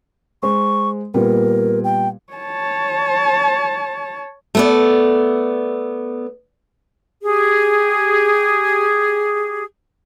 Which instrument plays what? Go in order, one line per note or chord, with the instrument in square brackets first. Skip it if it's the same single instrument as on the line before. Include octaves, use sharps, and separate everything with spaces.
[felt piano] G#3 C5 [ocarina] C#6
[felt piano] A#2 G3 B3 [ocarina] A#4
[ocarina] G5
[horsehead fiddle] C#5 A5
[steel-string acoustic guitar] A3 B3 D5
[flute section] G4 G#4